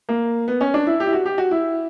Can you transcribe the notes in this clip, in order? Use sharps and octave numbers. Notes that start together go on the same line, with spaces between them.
A#3
B3
C#4
D4
E4
G4
E4
F#4
G4
F#4
E4